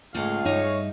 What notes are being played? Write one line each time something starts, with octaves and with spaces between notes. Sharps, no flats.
C#2 G#2 A3 A#3 G#4 F5
G2 D#4 C#5 E5